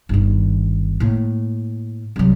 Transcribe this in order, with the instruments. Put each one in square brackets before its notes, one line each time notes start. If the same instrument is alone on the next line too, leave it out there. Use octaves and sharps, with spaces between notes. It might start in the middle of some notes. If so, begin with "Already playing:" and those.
[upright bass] G1 D#3
A2 A#3
C2 F#3